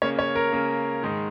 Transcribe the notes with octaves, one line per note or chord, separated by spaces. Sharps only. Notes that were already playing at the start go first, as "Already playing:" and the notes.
C#3 A#3 C#5
C#5
A#4
C#3 A#3
G#2 D#3 G#3